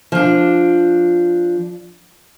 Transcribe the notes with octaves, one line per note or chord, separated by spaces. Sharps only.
F3 D4